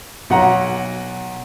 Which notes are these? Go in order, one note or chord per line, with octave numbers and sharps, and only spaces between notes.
B1 F#5 A#5